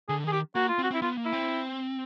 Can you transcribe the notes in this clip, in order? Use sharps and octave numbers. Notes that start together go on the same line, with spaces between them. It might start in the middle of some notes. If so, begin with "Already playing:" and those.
D3 G#4
D#3 G#4
G4
A#3 F#4
F4
C4
F#4
C4 E4
B3 F4
A#3
E4
C4